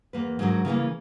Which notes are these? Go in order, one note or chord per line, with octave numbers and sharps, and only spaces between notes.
E2 A#3 B4
G#2 D3 F#3 G#3 A#4
C#3 E3 G#3 A#3